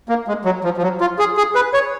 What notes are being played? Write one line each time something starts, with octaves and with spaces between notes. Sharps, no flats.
A#3
G#3
F#3
F3
F3
F#3
F4
G#4
G#4
B4
C#5